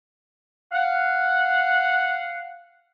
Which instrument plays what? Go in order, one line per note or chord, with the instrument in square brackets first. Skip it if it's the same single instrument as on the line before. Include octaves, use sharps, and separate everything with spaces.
[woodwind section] F5 F#5